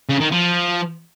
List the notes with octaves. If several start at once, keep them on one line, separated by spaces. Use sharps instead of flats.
C#3
D#3
F3